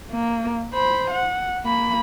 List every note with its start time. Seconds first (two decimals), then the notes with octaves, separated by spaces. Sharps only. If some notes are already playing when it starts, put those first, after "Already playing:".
0.11 A#3
0.74 C5 B5
1.11 F#5
1.64 A#3 B5